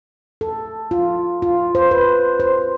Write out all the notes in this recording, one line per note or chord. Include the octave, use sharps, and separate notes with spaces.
A4
F4
F4
C5
B4
C5